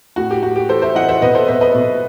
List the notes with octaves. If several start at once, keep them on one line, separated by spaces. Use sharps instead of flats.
A2 F#4
G4
A2 F#4
G4
E3 A4 C5
C5 E5
E3 D#5 F#5
C5 E5
B2 B4 D#5
A4 C5
B2 C5 E5
B4 D#5
B2